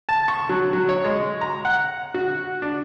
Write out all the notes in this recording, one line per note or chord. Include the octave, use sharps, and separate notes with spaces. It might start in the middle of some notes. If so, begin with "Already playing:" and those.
A5
C#6
F#3
F#3
C#5
G#3
A#5
F#5
F#4
D4